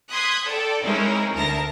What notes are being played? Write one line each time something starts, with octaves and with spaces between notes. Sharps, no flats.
C6 D#6 F#6 G#6 B6
A4 D5 G5
G#3 C4 C#4 D#4 E4 A#4
D2 A#4 A5 A#6